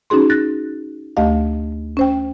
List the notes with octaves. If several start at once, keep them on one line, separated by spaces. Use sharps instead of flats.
C#4 D#4 F#4 G#4 C6
F#6 A6 A#6
D2 A3 G4 D#5 F5
C#4 C5 G5